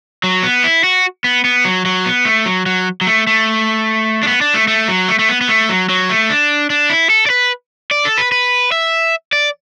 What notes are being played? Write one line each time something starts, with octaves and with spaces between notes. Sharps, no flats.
F#3
B3
E4
F#4
B3
B3
F#3
F#3
B3
A3
F#3
F#3
F#3
A3
A3
D4
B3
D4
A3
A3
F#3
A3
A3
B3
B3
A3
F#3
F#3
A3
D4
D4
E4
A4
D5
B4
D5
A4
B4
B4
E5
D5